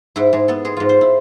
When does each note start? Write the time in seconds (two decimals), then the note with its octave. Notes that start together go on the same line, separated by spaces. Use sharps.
0.16 G#2 E4
0.33 G#2 G#4
0.48 B3 A4
0.65 G#3 G#4
0.77 G#2 F4
0.89 C5
1.01 E4